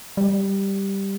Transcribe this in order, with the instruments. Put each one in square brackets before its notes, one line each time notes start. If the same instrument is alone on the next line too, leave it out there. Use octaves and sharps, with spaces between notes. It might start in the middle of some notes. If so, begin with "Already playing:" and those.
[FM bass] G3